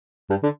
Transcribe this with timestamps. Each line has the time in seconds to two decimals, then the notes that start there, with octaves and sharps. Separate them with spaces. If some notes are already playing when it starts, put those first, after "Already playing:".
0.30 G2
0.43 D3